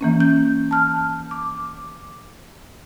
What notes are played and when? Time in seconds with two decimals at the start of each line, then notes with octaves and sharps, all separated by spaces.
0.01 E3 A#3 C#4
0.20 G6
0.71 A5 F6
1.31 D6